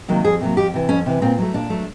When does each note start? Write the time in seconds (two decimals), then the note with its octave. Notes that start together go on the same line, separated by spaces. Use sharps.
0.08 C3 D#3 F#3 A#3
0.24 F2 G#4
0.41 C3 D#3 F#3 A#3
0.57 F2 G4
0.74 C3 E3
0.89 F2 C#4
1.06 C3 E3
1.22 A#2 C4
1.38 F#3 A3
1.54 A#2 D4
1.70 F#3 A3